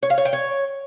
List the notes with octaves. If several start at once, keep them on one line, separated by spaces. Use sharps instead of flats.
C#5
F5
C#5
G5
C#5